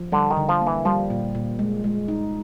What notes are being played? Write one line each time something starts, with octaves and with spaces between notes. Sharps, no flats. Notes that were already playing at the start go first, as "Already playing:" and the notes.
Already playing: F3
D3 G3
D#3
D3
F3
A#3
E3
F3 G3
A#2
A#2
G#3
G#3
D#4